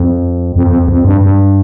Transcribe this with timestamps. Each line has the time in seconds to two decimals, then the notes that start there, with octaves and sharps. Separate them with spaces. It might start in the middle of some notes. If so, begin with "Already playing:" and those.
Already playing: F2
0.56 F2
0.67 F2
0.85 E2
0.89 F2
1.05 G2
1.21 G2